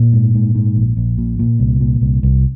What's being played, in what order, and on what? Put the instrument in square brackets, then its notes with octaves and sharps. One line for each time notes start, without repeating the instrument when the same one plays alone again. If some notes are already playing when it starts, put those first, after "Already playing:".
Already playing: [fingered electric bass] A#2 A#3
G#2
G#2
G#2
A#1
A#1
A#2
A#2
C2
A#2
C2
C2